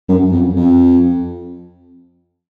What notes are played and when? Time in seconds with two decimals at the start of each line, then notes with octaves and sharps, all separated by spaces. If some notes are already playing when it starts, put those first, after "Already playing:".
0.08 F#2
0.32 F2
0.56 F2